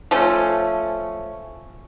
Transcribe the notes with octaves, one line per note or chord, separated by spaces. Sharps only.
F3 A3 C#4